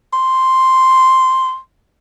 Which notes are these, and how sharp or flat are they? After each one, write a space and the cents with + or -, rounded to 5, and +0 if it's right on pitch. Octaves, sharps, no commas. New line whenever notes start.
C6 +0